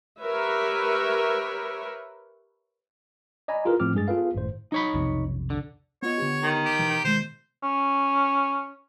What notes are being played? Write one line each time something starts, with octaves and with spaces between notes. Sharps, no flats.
G4 A#4 B4 C#5 E5
D5 D#5 G#5 A#5 B5
E4 F4 G#4 A#4 B4
A2 F3 C4 D6 F6
G2 G#3 G#4 A6
B3 F4 G#4 A4 B4 F5
G#1 F#2 A2 C5
D#4 C#5 B5
B1 F2 C3
D3
B3 F4 C#5 D#5
D3 B3 G4
D#3
G4
B2 E3
B2 D#3 G#3 C5
C#4